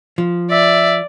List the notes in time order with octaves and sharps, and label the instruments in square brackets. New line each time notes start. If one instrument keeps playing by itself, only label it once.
[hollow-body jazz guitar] F3
[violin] D5 [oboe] E5